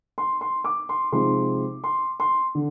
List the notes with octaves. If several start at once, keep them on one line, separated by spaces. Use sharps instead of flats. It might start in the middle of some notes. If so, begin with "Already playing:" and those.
C6
C6
D6
C6
C3 F3 G#3 C4 D#4 C6
C6
C6
D3